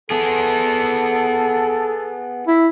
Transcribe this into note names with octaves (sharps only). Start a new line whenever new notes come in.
B3 G#4 A4
E4